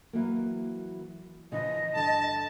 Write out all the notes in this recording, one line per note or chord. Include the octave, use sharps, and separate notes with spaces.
E3 F#3 A#3
C#3 E3 F3 D#5
G2 D3 A5